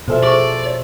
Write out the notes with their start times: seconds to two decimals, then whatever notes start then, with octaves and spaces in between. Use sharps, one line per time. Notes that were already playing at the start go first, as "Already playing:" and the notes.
0.08 B2 F3 A4 C5 E5 G#5
0.23 G#4 C5 D5 C#6